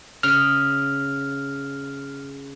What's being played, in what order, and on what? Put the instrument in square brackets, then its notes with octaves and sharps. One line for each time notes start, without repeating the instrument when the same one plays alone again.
[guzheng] C#3 [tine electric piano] F6